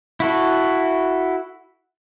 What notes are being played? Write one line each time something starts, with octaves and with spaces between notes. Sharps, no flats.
E4 F#4 A4